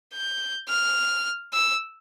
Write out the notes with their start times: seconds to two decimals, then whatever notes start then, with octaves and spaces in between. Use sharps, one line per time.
0.14 G6
0.69 F6
1.54 E6